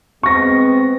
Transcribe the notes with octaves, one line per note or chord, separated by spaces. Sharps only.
G#3 B3 C4 C#6 A#6